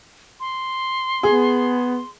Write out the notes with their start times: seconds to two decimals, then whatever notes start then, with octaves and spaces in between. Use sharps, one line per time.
0.40 C6
1.23 B3 G#4